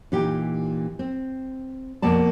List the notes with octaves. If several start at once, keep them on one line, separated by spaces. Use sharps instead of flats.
A#2 E3 D#4 G4
C4
F2 B2 A#3 D5 A5